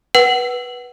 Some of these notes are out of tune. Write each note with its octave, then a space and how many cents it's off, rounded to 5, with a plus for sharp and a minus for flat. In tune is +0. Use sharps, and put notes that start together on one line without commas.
B4 -15 F#5 +25